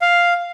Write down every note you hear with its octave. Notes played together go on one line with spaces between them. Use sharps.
F5